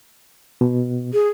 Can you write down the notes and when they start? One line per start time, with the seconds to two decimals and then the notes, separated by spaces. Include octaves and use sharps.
0.61 B2
1.13 G#4